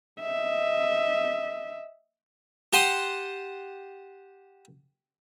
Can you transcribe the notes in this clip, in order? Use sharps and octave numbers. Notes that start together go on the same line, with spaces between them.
D#5 E5
G4 F#5 A5 C6 D#6